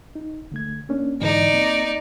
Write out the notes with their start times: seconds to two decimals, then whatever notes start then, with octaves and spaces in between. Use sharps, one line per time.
0.15 D#4
0.52 D3 A3 G#6
0.89 A#3 C#4 D4
1.22 G#2 D3 E3 D#4 D5
1.54 A#3 C4